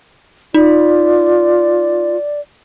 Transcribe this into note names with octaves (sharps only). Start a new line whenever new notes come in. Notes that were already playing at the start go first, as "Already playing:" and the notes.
D#4 F4 D5